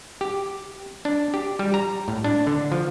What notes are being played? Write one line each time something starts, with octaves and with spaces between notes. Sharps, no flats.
G4
D4
G4
G3
A#5
A2
D4
D3
F3